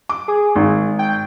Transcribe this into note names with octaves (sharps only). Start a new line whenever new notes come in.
D6
G#4
G#1
G5